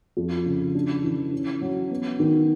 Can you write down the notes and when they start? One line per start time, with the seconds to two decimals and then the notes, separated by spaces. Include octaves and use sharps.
0.17 F2
0.45 C#3
0.75 D4
1.04 E3
1.33 C#4
1.61 F#3
1.91 B3
2.19 D#3